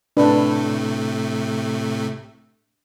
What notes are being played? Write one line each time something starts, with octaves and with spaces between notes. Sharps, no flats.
A2 C3 A3 D4 B4